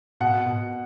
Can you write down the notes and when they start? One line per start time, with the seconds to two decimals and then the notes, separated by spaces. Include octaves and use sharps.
0.20 B2 F#5
0.46 B2